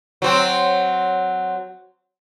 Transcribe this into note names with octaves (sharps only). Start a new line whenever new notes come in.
F#3 C4